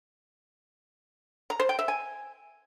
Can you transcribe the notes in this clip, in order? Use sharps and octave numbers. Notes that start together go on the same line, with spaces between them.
A#5
C5
G5
E5
G#5